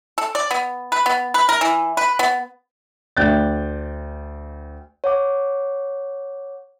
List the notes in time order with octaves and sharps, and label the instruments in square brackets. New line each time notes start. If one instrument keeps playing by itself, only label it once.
[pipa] A4
D5
B3
B4
B3
B4
A#4
E3
B4
B3
[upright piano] D2 D5 G5 F#6 G6 A6
[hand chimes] C#5 F#5 D6